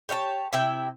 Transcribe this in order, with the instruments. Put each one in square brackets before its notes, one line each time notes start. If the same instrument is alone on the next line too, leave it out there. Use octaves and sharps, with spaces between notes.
[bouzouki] G4 C#5 F5 A5
C3 E4 E5 G5